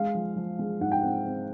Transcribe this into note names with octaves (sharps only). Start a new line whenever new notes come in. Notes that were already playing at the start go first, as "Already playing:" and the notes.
Already playing: G#3 F5
F3
F3
G#3
G#2 F#5
G5
C4 F#5
C4